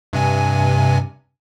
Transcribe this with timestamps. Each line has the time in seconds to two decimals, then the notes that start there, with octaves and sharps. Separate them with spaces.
0.13 G2 C3 G#5